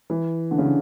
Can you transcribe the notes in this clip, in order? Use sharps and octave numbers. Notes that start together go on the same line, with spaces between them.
E3
D3
C#3
D3